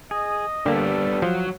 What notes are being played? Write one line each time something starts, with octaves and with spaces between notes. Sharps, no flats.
G#4 D#5
D3 G3 A#3 B3 D4 G4 A4
F3 F#3